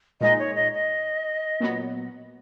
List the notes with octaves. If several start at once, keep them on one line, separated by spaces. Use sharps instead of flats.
A#2 G#3 D#4 D#5
C#5
D#5
D#5
A#2 F#3 B3